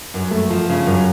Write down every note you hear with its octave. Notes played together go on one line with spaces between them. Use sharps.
F#2
A3
F3
C#3
F#2